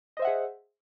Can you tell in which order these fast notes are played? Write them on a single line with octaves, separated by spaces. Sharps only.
D#5 C5 E5 F#5 G#4